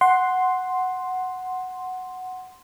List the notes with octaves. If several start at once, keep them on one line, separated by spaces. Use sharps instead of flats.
F#5 C6